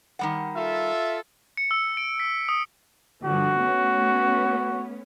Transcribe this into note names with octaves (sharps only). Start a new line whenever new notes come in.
D#3 G3 F#5
F4 A4 E5
C#7
E6
D7
B6
D#6
G2 D3 F3 F#4
A3 B3 C#4